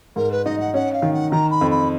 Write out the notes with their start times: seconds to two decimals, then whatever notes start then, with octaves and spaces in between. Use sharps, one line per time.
0.16 G#2 A#4
0.31 B4
0.45 D#4 D#5
0.59 F#5
0.74 C#4 F#5
0.93 F5
1.02 D#3
1.13 F#5
1.31 D#3 A#5
1.50 B5
1.61 F2
1.70 B5